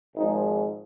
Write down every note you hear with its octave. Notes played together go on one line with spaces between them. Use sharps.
G#1 G#2 F3 G#3 D#4